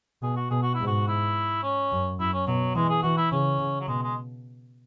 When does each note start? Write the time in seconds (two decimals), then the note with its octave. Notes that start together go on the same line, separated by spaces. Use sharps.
0.22 B2 G#4
0.36 F#4
0.51 B2 G#4
0.63 F#4
0.74 E4
0.80 G#2
0.87 F#4
1.08 E4
1.63 C#4
1.92 F#2
2.20 F#2 E4
2.33 C#4
2.47 B2 F#3
2.75 E3 G#3
2.89 G#4
3.03 E3 F#4
3.17 E4
3.32 C#3 C#4
3.59 C#3
3.81 F#3
3.88 B2 G#3
4.03 G#3